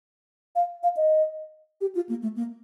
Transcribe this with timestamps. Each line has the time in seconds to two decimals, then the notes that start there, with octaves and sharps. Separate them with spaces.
0.55 F5
0.83 F5
0.97 D#5
1.81 G4
1.95 F4
2.09 A#3
2.22 A3
2.36 A#3